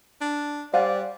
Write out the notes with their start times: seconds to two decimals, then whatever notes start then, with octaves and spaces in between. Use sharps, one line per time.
0.21 D4
0.74 G3 C5 D5 F5 F#5 G#5